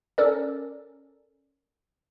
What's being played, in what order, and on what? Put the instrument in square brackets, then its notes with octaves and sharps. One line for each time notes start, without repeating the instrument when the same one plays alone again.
[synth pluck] C#4 A4 A#4 D5